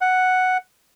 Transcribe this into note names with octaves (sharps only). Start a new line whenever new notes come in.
F#5